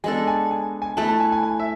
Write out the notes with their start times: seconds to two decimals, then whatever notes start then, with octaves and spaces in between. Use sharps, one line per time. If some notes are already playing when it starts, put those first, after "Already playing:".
0.04 G#3 B3 D4 A4 G#5
0.27 G#5
0.51 G#5
0.82 G#5
0.97 A3 E4 B4 A5
1.09 A5
1.20 G#5
1.32 G#5
1.43 G#5
1.60 E5